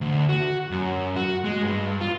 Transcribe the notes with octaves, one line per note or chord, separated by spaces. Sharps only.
D2
F#4
F#2
F#4
G#3
G2
F4